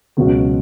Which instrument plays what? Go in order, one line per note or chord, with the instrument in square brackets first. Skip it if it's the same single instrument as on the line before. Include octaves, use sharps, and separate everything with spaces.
[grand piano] C#2 B2 F#3 C#4 F#4